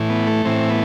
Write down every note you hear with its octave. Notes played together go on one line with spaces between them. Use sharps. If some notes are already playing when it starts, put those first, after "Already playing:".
Already playing: A2 E3
B3
A3
A2 E3 C4
B3